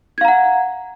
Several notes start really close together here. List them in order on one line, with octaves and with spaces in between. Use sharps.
G#6 F5 A#5 F#5